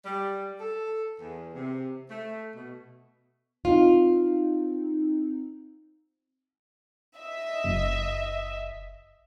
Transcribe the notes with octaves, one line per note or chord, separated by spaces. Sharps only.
G3
A4
E2
C3
A3
B2
C4 D#4 F4
D#5 E5
F#1